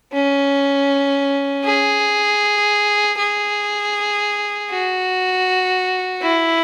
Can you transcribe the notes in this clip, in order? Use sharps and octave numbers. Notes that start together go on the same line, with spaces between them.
C#4
G#4
G#4
F#4
E4